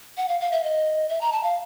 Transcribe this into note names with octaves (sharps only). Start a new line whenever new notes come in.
F#5
F5
F5
E5
D#5
E5
A#5
A5
F5